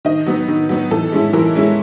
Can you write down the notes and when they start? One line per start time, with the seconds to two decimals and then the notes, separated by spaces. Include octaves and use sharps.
0.05 D#3 D#5
0.26 F#3 B3 D#4
0.48 D#3
0.69 F#3 B3 D#4
0.91 E3 A4
1.12 G#3 C#4 E4
1.33 E3 A#4
1.55 G#3 C#4 E4